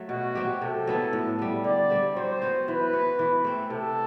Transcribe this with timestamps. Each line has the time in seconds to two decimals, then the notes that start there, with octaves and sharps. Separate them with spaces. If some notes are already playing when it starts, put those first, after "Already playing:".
Already playing: F#3 A3
0.09 B2 F#4
0.35 F#3 C4 G4
0.62 C3 A4
0.87 F#3 B3 E4
1.13 A2
1.39 G3 B3
1.64 D3 D5
1.90 G3 C4
2.16 F#3 C5
2.42 B3 F#4
2.68 E3 B4
2.93 B3 F#4
3.19 E3
3.44 A3 C4
3.70 C3 A4